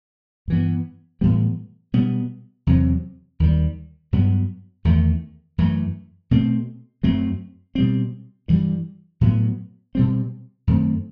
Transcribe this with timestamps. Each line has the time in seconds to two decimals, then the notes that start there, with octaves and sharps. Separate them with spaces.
0.48 G2 E3 B3
1.21 A2 E3 G3 B3
1.94 B2 G3 B3
2.67 E2 C3 F#3 C4
3.40 D#2 D#3 G3
4.13 G2 F#3 B3
4.85 E2 D#3 A3
5.58 F#2 E3 A3
6.31 B2 A3 C4
7.03 F#2 F#3 A3 C4
7.75 B2 G3 C4
8.48 G2 E3 G3
9.21 A2 F#3 B3
9.95 B2 G3 C4
10.67 F#2 D#3 A3 C4